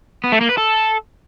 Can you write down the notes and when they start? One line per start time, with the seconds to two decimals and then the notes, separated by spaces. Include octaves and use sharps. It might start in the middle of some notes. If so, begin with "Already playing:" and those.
0.24 B3
0.32 A3
0.41 A#3
0.49 B4
0.58 A4